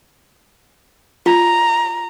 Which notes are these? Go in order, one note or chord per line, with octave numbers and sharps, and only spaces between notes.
F4 A#5